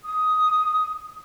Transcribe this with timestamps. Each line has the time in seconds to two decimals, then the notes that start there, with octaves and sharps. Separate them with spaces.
0.04 D#6